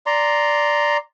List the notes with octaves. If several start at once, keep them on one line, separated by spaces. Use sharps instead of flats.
D5 A#5 C6